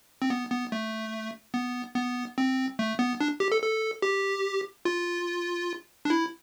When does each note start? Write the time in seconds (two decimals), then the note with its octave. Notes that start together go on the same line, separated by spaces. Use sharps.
0.22 C4
0.30 B3
0.51 B3
0.72 A3
1.54 B3
1.95 B3
2.38 C4
2.79 A3
2.99 B3
3.21 D4
3.40 G4
3.52 A4
3.62 A4
4.02 G4
4.85 F4
6.05 D4
6.10 E4